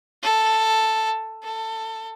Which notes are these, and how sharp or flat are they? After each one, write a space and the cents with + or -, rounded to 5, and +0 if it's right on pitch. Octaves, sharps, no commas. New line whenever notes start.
A4 +5
A4 +20